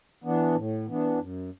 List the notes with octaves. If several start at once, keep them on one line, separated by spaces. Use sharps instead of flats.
E3 B3 D4
A2
E3 B3 D4
F#2